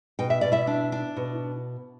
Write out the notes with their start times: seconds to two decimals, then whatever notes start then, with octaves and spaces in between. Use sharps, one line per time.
0.19 B2 G5
0.30 E5
0.41 B2 D5
0.52 E4 E5
0.67 D4
0.92 D4
1.16 B2